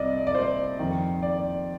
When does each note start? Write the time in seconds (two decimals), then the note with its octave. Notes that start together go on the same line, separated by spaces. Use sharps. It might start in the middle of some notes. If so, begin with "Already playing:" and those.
Already playing: C2 C3 D5 D#5
0.27 D5
0.35 C5
0.78 F2 D#3
1.23 D5